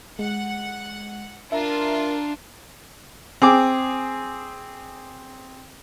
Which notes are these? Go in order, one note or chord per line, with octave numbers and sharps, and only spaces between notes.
G#3 F#5
D4 F4 A#4 E5 A#5
C4 G#4 D6